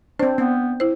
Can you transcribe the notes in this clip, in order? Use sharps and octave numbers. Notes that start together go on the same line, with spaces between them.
C4 D4 C5
B3 C4
E4 C5